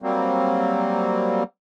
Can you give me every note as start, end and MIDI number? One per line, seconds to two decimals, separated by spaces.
0.02 1.43 54
0.02 1.43 55
0.02 1.43 58
0.02 1.43 60